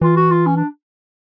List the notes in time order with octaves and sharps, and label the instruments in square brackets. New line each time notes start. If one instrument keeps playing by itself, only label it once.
[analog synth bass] E3 [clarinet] F4
[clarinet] F#4
F4
C#4
D4